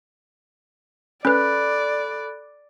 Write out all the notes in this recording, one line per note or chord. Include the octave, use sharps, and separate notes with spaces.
C#4 A4 B4 D5 B5 F#6